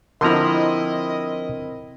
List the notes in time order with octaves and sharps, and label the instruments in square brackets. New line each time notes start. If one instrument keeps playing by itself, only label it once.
[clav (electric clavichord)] D3 F3 A#5 [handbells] C4 A#4 [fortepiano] E4 C6 [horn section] D#5